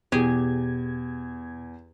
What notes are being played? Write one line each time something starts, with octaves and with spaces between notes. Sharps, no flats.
E2 B2 G4 G#4 G#6